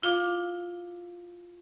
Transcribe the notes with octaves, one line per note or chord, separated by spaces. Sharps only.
E4 F4 F5 D6